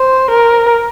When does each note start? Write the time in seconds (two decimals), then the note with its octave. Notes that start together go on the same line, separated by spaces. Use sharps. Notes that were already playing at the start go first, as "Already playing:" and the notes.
Already playing: C5
0.30 A#4